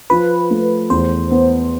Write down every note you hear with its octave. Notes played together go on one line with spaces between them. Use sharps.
F3 B4
A3
E2 C5
B3